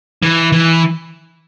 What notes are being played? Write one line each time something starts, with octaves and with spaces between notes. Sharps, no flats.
E3
E3